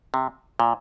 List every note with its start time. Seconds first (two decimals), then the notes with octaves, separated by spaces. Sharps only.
0.14 C3
0.60 A#2